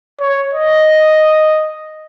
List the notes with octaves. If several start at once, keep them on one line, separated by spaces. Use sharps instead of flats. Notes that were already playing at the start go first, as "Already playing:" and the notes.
C#5
D#5